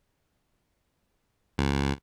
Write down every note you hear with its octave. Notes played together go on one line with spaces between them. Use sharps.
C#2